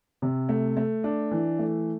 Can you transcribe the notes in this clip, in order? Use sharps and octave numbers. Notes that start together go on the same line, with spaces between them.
C3
A3
A3
D4
E3
A3